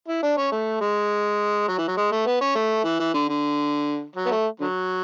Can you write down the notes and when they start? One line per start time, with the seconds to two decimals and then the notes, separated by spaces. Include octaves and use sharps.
0.08 E4
0.23 D4
0.38 C#4
0.52 A3
0.81 G#3
1.68 F#3
1.78 E3
1.88 F#3
1.97 G#3
2.12 A3
2.26 B3
2.41 C#4
2.56 A3
2.85 E3
3.00 E3
3.14 D3
3.29 D3
4.16 F#3
4.26 B3
4.31 A3
4.60 D3 F#3